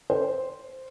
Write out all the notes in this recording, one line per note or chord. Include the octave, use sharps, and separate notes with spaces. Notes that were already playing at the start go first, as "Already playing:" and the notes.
C5